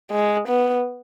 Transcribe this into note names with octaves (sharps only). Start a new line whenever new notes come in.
G#3
B3